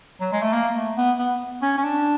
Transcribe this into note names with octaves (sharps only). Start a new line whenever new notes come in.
F#3
G#3
A3
A#3
A3
B3
B3
C#4
C#4
D4